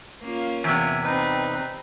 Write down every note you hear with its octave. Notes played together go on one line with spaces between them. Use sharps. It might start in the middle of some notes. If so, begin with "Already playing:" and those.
A#3 C#4 F4
E2 C3 E5 G#5
C4 D#4 B4